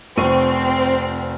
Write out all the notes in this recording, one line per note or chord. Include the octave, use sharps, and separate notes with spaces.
F1 C4 C#6 D#7